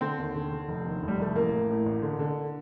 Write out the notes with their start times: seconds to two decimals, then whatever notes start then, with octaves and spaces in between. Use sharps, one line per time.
0.01 D3 C4
0.18 D#2
0.35 D3
0.51 D3
0.68 F1
0.85 D#2
1.02 F1
1.08 G3
1.19 F1 A3
1.36 A1 A#3
1.52 A2
1.70 A2
1.86 A1
2.02 D3
2.19 D3